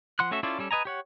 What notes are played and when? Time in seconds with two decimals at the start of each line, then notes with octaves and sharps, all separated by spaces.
0.19 F3 F#5 C6 F#6
0.31 A3 C#4 F#4 A4 E5
0.43 C#4 E4 F4 A4 D5
0.59 G3 C#4 A4
0.71 B4 D#5 G#5 A#5
0.85 G4 C#5 F#5